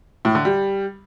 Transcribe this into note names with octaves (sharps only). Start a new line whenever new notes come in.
A2
D3
G3